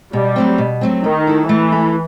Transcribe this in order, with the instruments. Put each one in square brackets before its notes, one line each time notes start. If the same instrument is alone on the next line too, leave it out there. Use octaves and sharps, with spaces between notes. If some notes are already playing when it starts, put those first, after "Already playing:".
[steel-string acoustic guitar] B2 [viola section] G3
[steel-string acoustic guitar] F#3 A3 C4
B2
F#3 A3 C4
[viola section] D#3 [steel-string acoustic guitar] A3
[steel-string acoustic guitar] E4 A4
[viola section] E3 [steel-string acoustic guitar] A3
[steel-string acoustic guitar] E4 A4